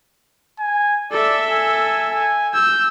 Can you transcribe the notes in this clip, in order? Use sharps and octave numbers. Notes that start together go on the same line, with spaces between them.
G#5
A4 D5 E5
G#5
G#5
E6 G6